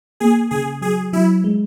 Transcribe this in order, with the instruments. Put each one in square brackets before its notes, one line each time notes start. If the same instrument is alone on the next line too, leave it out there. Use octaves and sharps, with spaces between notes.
[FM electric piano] A#3 [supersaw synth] G#4
[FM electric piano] C#3 [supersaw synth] G#4
[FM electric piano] F#3 [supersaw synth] G#4
[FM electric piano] F#3 [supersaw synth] E4
[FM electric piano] G#3